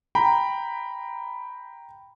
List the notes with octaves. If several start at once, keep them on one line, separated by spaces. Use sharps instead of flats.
G5 A#5 B5